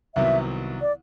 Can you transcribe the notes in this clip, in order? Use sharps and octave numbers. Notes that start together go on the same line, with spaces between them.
C2 C3 D#3 F#3 B3 E5
D5